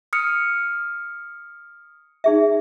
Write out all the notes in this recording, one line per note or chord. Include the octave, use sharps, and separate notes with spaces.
D#6 F6 C#7
D#4 G#4 E5